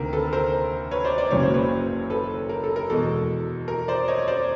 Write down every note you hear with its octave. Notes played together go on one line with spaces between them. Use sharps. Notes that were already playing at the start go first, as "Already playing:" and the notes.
Already playing: D2 C3 D#3 A#4
A4 B4
A#4 C5
B4 C#5
C5 D5
D5
F#1 F#2 C#3 F#3 A#3 C#5
C5
B4 C#5
A4 B4
A#4
A4
A#4
E2 B2 G#3 A4
A#4
C5 D5
C#5 D#5
C5 D5